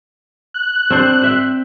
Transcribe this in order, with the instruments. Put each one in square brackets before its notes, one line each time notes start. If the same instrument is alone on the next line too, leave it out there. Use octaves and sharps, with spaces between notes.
[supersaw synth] F#6
[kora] C4 D4 C5
C5 E5 G5